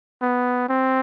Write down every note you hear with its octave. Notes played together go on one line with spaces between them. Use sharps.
B3
C4